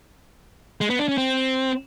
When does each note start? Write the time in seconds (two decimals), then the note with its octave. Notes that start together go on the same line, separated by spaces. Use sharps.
0.81 G#3
0.90 B3
0.99 D4
1.08 C#4
1.18 C4